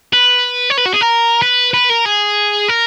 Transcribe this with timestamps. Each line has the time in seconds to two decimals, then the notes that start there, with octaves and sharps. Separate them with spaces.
0.13 B4
0.70 C#5
0.78 B4
0.86 F#4
0.94 G#4
1.01 A#4
1.42 B4
1.74 B4
1.90 A#4
2.05 G#4
2.69 A#4